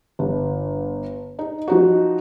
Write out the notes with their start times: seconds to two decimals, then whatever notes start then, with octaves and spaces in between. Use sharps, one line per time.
0.19 G1
1.39 D#4
1.68 F3 D#4 F#4